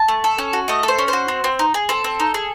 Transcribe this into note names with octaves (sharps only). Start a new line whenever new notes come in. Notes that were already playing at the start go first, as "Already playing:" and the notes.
Already playing: A5
A3
A4
C#4
F#4
A3 D#5
A4
C5
C#4
C5
F#4
C4
C4
D#4
G#4
C4 A4
C4
D#4
G#4